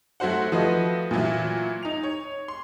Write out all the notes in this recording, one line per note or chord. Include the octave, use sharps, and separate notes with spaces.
F#3 A3 F#4 C5 F#5
F3 A3 F#4 B4 D#5
A#2 E3 F#3 E4
D#4 F7
C#5
C6